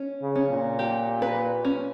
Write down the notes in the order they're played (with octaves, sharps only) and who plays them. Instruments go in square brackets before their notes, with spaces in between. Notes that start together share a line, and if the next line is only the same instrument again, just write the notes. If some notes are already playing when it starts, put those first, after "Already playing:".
Already playing: [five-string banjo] C#4
[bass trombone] C#3
[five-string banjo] C#4
[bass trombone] A#2
[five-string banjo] G4
B4
C#4